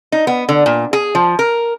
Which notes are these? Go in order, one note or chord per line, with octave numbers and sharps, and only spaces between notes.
D#4
B3
D3
A#2
G#4
F3
A#4